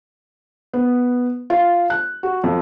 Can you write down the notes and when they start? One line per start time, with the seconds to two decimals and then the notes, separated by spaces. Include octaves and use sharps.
0.73 B3
1.50 F4
1.90 F#6
2.23 F#4
2.43 F2